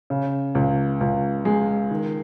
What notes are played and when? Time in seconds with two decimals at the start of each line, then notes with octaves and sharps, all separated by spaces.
0.10 C#3
0.55 C#2
1.01 C#2
1.45 G#3
1.91 D#3